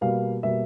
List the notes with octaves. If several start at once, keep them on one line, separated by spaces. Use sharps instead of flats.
B2 G3 A#3 F5
B2 G3 A#3 E5